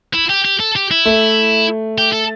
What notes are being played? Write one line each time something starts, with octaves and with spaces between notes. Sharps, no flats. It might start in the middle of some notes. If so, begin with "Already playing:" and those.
E4
G4
G4
A4
G4
E4
A3
G4
A4